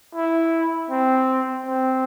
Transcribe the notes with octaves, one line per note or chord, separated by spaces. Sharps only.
E4
C4
C4